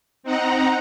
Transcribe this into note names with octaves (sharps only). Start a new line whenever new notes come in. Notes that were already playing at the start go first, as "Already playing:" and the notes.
C4 D#4 F#5 A#5